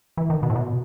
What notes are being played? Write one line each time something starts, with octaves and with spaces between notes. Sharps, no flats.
E3
D#3
B2
A2
B2